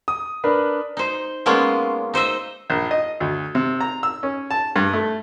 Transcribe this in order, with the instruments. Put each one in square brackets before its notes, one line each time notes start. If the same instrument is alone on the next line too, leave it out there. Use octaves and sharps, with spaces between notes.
[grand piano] D#6
D4 A#4 B4
[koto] D#4 C5
G#3 A#3 B3 C#4 F4
D#4 C5 D#5 E5
[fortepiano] A#1
D#5
D2
C3
A#5
E6
C#4
A5
G2
A3